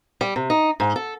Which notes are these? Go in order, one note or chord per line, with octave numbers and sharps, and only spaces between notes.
G3
C3
D#4
G#2
A4